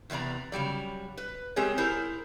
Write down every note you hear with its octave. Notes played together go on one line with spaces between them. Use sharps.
E2 C3 B3 D5 A#5
C#3 F#3 G3 D5
B4
G#3 C4 G4 G#4 A#4 C#5
E4 G#4 A#4 C5